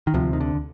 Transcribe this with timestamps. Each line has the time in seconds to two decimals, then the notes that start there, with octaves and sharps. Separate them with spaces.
0.07 D#3
0.14 D2 C3 F3
0.33 D#3
0.40 D3